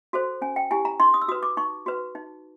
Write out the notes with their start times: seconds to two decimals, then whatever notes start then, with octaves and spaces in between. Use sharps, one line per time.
0.13 F#4 A4 C5
0.41 C#4 G#5
0.56 G5
0.71 E4 G4 G#5
0.85 A#5
1.00 D#4 C6
1.14 D#6
1.21 E6
1.28 F#4 B4 D#6
1.43 D6
1.57 D#4 C#6
1.86 F#4 B4
2.15 D#4